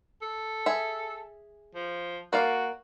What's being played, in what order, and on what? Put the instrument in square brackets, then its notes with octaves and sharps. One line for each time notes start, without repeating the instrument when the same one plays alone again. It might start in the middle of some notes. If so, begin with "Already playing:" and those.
[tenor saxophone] A4
[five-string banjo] G#4 E5
[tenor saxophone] F3
[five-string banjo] A#3 D5 F5 [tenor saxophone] F#4